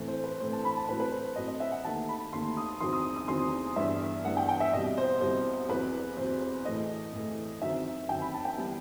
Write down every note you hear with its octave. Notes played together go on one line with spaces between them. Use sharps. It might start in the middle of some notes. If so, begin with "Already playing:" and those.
Already playing: A2 E3 A3 C4
C5
B4
A2 E3 A3 C4 C5
A5
B5
A5
A2 F#3 C4 B4
B4
C5
A2 F#3 C4 D#5
D#5
E5
F#5
D#2 D#3 A3 A5
B5
D#2 D#3 A3 C6
D#6
E2 D#3 F#3 C4 C6
D#6
D#6
E2 D#3 F#3 C4 C6
G2 E3 B3 E5
G2 E3 B3 F#5
G5
G5
E5
C2 B2 G3 D#5
C5
C2 B2 G3 C5
E2 C3 F#3 B4
E2 C3 F#3 C5
C5
A2 E3 A3 D#5
A2 E3 A3
F#2 D#3 F#3 C4 E5
F#2 D#3 F#3 C4 G5
B5
A5
G5
E3 G3 B3